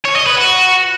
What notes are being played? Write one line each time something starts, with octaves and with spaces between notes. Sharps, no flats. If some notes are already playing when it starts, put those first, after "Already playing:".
C#5
D#5
B4
F#4